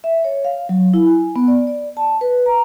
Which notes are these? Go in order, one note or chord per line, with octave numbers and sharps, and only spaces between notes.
E5
C#5
F5
F#3
E4
G#5
B3
D5
D5
A5
B4
A#5